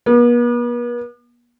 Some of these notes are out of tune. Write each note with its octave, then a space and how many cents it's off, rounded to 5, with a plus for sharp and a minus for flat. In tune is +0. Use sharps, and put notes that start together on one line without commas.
B3 -45